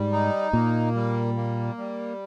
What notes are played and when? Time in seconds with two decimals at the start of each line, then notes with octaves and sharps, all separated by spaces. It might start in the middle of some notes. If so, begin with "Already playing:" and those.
Already playing: G#2 G3
0.12 D#4
0.53 A#2 A#3
0.95 G3
1.36 A#3
1.78 G3